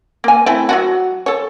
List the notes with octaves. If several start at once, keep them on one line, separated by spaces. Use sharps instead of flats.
A#3 G#5
A3 C4 E4
F#3 F4 F#4
A4 C#5